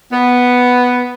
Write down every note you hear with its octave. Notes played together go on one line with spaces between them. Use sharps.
B3